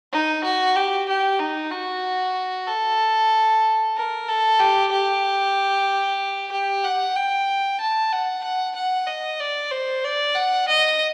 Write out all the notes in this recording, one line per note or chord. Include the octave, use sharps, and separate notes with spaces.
D#4
F#4
G4
G4
D#4
F#4
A4
A#4
A4
G4
G4
G4
F#5
G5
A5
F#5
F#5
F#5
D#5
D5
C5
D5
F#5
D#5